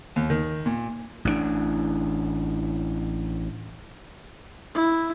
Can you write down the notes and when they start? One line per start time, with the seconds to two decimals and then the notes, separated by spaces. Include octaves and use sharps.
0.16 D#2
0.30 D#3
0.66 A#2
1.25 A1 A2 C3 D4
4.75 E4